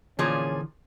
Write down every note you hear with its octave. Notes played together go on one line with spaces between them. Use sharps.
A#2 D3 E3 F3 C#4 G#4